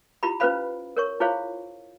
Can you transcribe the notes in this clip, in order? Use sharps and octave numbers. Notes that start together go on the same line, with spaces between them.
E4 F4 G4 A#5 B5
C#4 F4 B4 C5 F5 B5
A#4 C#5 C#6
E4 F4 G#4 C5 C#5 F5